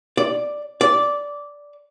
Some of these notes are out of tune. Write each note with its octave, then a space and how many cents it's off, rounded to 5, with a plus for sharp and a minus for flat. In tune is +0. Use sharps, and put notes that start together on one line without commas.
D5 +5
D5 -10